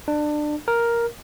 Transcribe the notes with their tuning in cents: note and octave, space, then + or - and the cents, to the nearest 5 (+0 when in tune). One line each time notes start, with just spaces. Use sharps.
D4 +25
A#4 +5